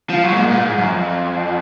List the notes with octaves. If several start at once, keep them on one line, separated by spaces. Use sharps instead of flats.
F3
F#3
G#2
A#2
G#2
A#2
G#2
F#2
F2